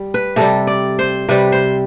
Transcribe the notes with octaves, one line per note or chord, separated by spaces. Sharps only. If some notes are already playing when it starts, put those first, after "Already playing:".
Already playing: G3
B4
C3 G3 A4
D5
C5
C3 G3 B4
C5